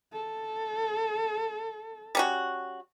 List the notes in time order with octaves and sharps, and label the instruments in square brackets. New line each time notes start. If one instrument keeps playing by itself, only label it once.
[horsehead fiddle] A4
[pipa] G3 C#4 F#4